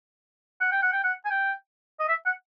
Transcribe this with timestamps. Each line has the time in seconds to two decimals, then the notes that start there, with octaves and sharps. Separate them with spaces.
0.61 F#5
0.72 G5
0.82 F#5
0.93 G5
1.04 F#5
1.25 G#5
1.30 G5
1.99 D#5
2.08 E5
2.26 F#5